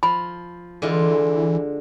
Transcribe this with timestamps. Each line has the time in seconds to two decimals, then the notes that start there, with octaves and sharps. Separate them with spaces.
0.03 F3 B5
0.82 D3 E3 G#3 F4